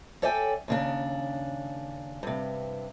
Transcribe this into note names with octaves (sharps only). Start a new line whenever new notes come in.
A4 C#5 D5 E5 G5 G#5
D#2 C#3 D4
G2 C3